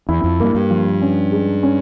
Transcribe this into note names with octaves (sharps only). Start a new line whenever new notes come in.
E2 E4
F2
G2 A#3
G2
F3
C#4
G#3
C#4